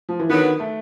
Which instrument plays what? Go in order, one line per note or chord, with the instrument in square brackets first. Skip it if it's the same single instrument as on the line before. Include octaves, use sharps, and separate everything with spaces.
[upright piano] F3
E3
[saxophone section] D3 F#3 B3 [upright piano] D#3
[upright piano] A3